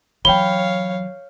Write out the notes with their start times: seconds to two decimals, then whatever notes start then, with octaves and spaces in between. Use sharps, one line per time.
0.25 E3 F#3 C#5 F5 G5 B5 G7